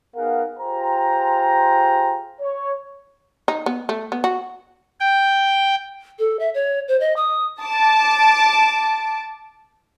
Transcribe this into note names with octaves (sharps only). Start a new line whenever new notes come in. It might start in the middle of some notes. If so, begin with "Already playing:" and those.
B3 D#4 G#4 A#4 F5 F#5
F4 G4 G#4 C5 G5 A#5
C#5
D#4
B3
A3
B3
F#4
G5
A4
E5
C#5
C5
D#5
D#6
A5 D6